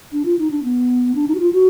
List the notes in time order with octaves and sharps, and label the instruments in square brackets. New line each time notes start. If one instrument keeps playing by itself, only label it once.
[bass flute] D4
F4
D#4
D4
B3
D4
D#4
F#4
F4
F#4